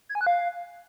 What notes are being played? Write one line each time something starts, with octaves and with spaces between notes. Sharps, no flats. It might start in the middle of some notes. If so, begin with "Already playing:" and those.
G#6
G#5
F#6
F5